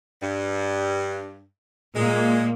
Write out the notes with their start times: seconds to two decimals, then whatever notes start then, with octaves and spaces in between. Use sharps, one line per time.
0.22 G2
1.96 A#2 G#3 A#3